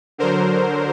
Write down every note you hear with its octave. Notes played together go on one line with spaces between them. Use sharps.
D3 F#3 A#4 C5